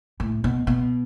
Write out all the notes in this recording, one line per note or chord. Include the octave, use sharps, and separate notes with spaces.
A2
B2
B2